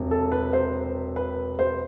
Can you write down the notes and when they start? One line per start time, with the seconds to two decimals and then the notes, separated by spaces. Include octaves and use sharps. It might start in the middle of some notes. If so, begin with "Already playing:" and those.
Already playing: E1 C3
0.11 A4
0.32 B4
0.53 C5
1.16 B4
1.59 C5